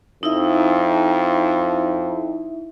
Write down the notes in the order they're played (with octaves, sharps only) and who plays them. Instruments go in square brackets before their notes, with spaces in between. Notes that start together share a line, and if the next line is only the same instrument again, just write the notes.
[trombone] F2 [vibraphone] D#4 E4 E5